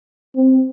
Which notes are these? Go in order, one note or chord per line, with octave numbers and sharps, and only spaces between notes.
C4